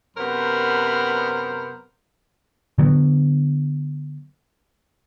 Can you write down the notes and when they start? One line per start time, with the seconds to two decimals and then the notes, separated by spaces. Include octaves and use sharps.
0.17 F#2 C3 B3 A#4 C5 B5
2.78 D3 F#3 B3